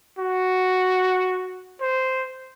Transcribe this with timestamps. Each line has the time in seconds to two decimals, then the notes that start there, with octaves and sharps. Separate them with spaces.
0.19 F#4
1.81 C5